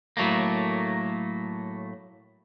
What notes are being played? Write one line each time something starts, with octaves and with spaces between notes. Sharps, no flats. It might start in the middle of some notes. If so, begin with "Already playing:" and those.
A2 F#3 A3 A#3